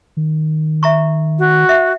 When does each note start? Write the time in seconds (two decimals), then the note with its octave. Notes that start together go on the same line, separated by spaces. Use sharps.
0.17 D#3
0.83 E5 A#5 C#6
1.39 F#4
1.69 E5 F#5